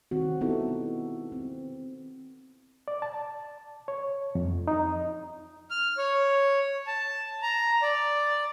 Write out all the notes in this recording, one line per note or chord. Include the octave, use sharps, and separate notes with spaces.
D#3 C4 F#4
B3 D#4 E4 F#4 G4 A4
C4
D5
A5
C#5
F2
D#4
F6
C#5
A5
A#5
D5